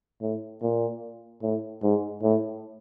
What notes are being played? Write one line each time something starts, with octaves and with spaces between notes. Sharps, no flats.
A2
A#2
A2
G#2
A2